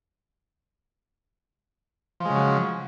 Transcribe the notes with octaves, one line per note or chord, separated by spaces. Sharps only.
C#3 F3 F#3 G#3